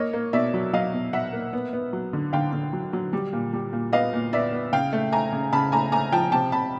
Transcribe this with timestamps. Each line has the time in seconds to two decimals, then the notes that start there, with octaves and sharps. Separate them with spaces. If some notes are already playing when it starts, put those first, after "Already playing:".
Already playing: A#3 C#5 D#5
0.13 A#3
0.33 B2 D5 E5
0.54 F#3
0.73 F#3 D#5 F5
0.93 B2
1.13 F#3 E5 F#5
1.33 A#3
1.53 B3
1.73 B3
1.93 F#3
2.13 D3
2.33 D3 F5 G5
2.53 D3
2.73 F#3
2.93 F#3
3.13 G3
3.33 A#2
3.53 G3
3.73 A#2
3.92 B3 D#5 F5
4.13 A#2
4.33 B3 D5 E5
4.52 B3
4.73 C#3 F5 G5
4.93 A3
5.12 A3 G#5 A#5
5.33 C#3
5.53 C#3 A5 B5
5.72 A3 G#5 A#5
5.92 A3 G#5 A#5
6.12 F3 G5 A5
6.32 C3 G5 A5
6.52 C3 A5 B5